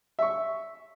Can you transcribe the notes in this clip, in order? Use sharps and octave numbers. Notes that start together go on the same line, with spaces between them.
E5 C#6